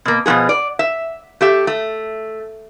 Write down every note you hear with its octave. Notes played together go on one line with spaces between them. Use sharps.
B2 A#3
B2 F3 A#3 B3 G#4
D5
E5
A3 G4 E5
A3